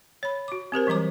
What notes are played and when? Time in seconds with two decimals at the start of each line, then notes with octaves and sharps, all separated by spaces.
0.23 C#5 B5
0.48 F#4 D6
0.72 C4 G4 A#4 C5
0.87 E3 F#3 G3 A#5 D6